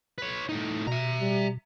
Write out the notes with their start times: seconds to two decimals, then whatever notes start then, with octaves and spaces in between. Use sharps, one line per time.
0.18 B4 C#5
0.49 A2 D#4
0.87 B2 E5 A#5
1.20 G3